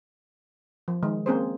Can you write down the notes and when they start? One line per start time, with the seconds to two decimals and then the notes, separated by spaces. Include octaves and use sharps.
0.88 F3
1.03 D#3 G#3
1.26 A#3 C4 C#4 G#4 A#4 C5